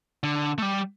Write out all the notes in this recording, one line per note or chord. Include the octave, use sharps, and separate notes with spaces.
D3
A3
G3